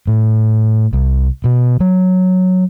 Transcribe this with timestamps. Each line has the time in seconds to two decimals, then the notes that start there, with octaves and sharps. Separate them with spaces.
0.07 A2
0.93 C2
1.44 B2
1.80 F#3